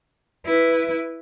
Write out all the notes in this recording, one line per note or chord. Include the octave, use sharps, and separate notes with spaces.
E4 B4